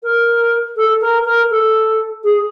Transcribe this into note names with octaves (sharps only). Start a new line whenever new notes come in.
A#4
A4
A#4
A#4
A4
G#4